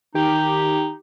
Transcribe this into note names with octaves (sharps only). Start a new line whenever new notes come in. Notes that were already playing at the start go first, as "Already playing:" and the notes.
D#3 D#4 G4